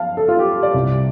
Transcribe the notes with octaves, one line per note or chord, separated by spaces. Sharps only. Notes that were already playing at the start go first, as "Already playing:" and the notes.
Already playing: F5 A5
A4
F4
G4
D5
C2 C3 G3